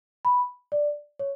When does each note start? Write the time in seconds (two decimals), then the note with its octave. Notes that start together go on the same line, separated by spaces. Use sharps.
0.25 B5
0.72 D5
1.19 C#5